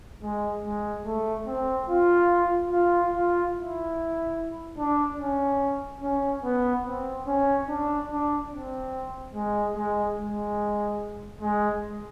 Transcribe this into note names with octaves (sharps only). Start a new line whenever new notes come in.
G#3
G#3
A3
C4
F4
F4
F4
E4
D4
C#4
C#4
B3
C4
C#4
D4
D4
C4
G#3
G#3
G#3
G#3